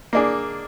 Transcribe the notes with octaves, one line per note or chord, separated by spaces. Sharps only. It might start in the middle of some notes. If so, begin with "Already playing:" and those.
A#3 D4 G#4